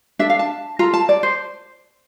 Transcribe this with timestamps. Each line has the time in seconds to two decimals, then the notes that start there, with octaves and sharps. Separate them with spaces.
0.19 D4 A4 E5
0.30 F5
0.39 A5
0.79 F4 A4 A#5
0.93 A5
1.09 D5
1.23 C5